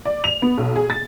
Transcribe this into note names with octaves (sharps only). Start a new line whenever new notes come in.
D5
F7
B3
B1
G#4
A6